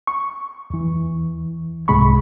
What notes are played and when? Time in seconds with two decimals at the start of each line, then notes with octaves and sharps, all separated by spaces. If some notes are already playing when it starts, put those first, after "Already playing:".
0.07 C#6
0.70 E2 E3
1.88 C2 G#2 C3 G#3 B5 C#6